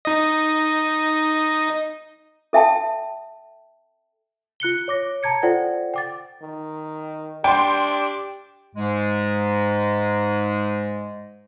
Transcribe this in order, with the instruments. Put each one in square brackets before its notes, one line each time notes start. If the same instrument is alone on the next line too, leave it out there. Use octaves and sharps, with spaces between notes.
[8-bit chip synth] D#4 D#5
[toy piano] A4 E5 G5 A5
[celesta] F4 F#6 C#7 G7
C#5 D6 A#6
A5 A#5 G#6 C#7
F4 A4 C5 D5 F#5 G5
G5 D6 A6
[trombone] D#3
[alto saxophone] D4 [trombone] G4 [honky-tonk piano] G5 C6
[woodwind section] G#2 G#3